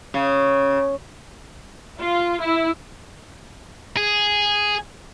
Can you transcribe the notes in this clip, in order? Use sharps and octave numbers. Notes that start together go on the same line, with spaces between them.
C#3
F4
E4
G#4